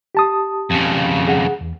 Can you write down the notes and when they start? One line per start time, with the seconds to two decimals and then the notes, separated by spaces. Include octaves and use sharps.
0.15 G4 A5 D#6
0.71 F2 C#3
1.28 G#4 F#5
1.61 E2